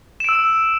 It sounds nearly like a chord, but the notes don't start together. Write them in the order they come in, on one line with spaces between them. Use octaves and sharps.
E7 D7 E6